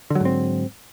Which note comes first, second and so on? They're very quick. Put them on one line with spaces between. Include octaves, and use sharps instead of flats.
D3 F#3 G#2 C4